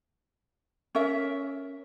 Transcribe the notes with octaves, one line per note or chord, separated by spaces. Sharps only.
C#4 A#4 E5